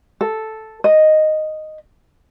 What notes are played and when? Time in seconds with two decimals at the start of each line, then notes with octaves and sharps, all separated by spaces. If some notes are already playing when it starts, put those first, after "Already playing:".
0.21 A4
0.84 D#5